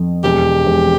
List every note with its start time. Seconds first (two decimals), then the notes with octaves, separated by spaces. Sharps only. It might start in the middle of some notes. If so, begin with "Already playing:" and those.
Already playing: F2
0.24 E1 G4
0.66 E1